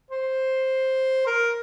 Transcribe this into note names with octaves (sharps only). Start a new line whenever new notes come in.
C5
A#4